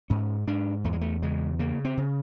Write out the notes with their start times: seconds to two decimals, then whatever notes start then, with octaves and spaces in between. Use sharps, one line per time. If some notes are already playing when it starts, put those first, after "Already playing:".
0.10 G#2 C#4
0.47 G#2 D4
0.84 E2 A3
0.93 G#3
1.01 A3
1.22 C#3 G#3
1.59 C#3 A#3
1.85 C4
1.97 C#3